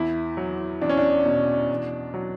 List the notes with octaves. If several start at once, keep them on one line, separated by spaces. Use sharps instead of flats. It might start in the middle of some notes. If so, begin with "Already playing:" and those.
Already playing: E2 E4
F#3
E2 D4
C#4
D4
B2
E2
F#3